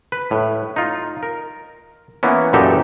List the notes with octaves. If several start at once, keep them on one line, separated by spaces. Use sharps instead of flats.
B4
A2
D#4 F4
A#4
E3 A#3 B3 C#4
F#2 A#2 E3 D#4 G4 A4